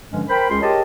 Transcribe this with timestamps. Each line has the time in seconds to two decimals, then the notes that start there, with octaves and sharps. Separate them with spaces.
0.12 G2 D3 F3 G#3 C#4
0.28 A#4 C5 G5 B5
0.50 C#2 G#3 C#4 F4 G#4 C6
0.61 G4 G#4 A#4 C#5 D#5 A5